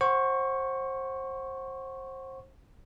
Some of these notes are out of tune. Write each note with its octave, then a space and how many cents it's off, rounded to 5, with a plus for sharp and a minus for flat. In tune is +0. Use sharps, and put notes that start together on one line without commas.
C5 +25 F#5 +0 C#6 +0